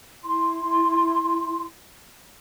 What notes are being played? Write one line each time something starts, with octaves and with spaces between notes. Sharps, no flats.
E4 C6